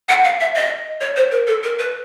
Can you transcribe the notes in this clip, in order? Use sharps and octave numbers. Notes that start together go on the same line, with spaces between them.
F#5
F5
E5
D#5
C#5
C5
A#4
A4
A#4
B4